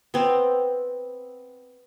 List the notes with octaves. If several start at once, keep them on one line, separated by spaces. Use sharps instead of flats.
B3 C4